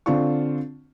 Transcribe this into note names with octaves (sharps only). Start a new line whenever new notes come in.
D3 C4 D4 F4 C#6